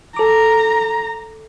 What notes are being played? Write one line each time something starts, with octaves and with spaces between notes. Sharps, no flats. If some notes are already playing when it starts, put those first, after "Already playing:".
A4 A#5 D6